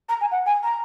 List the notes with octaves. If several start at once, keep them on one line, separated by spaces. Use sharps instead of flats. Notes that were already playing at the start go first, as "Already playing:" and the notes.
A#5
G#5
F#5
G#5
A#5